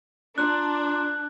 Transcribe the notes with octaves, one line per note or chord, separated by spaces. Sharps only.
D4 F4 A#5 C6 F#6